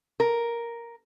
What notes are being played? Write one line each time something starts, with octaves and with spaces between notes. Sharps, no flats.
A#4